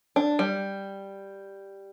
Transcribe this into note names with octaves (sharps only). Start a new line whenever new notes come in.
D4
G3